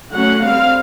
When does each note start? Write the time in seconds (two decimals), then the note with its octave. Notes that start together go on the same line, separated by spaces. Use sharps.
0.12 D3 F#3 A3 C#4 F#5
0.42 D3 G3 C4 F5